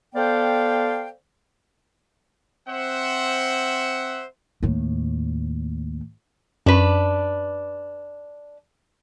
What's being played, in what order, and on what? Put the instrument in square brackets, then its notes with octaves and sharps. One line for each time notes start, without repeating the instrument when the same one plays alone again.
[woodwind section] B3 A4 C5 D5 F5 G5
[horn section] C4 C5 E5 F#5
[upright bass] D#2 A2
[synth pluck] F#2 [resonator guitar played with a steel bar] D4 B4